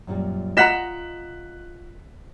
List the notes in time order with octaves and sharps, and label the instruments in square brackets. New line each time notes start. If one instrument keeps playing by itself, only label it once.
[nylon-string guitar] F#2 A#2 G3
[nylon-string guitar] F4 [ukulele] D#5 F#5 A#5 [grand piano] F#6 B6 E7